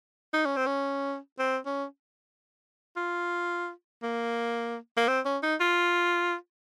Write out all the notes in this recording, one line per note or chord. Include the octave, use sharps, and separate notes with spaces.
D#4
C#4
C4
C#4
C4
C#4
F4
A#3
A#3
C4
C#4
D#4
F4